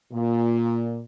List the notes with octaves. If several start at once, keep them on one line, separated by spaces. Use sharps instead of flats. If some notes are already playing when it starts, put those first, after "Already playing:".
A#2